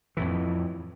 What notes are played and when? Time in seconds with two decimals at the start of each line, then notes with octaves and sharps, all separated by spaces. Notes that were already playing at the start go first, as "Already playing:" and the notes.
0.17 F2 A2 E3